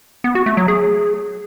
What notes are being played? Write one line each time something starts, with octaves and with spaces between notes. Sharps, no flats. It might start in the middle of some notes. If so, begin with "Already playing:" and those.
B3
F#4
A3
F#3
G#4